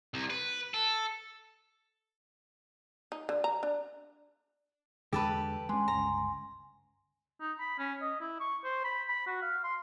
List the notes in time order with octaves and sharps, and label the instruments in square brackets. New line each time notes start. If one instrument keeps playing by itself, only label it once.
[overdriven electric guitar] C2
B4
A4
[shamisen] D#4
D3
A#5
D4
[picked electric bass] E2 D3 G#3 [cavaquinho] G4 A4 B4
[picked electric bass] G#3 C#4 [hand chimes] G#5 C6
[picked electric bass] G1 C#2 [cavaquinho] A#5
[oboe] D#4
B5
C#4
D#5
E4
C#6
C5
B5
B5
F#4
F5
C6